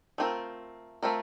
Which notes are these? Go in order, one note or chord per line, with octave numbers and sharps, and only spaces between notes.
A3 C4 F4 A#4
A3 C4 F4 A#4